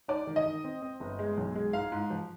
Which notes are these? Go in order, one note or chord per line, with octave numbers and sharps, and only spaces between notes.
D#4 D5
D#3
D#5
D#3
C4
C4
G1
G#3
B1
G#3
G#2 F5
G#2
F3